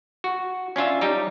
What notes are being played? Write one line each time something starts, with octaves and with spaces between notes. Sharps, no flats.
F#4
C#4 D4 F4 E5
G3 D#4 G4